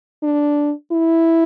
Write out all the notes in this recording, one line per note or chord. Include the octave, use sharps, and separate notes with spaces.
D4
E4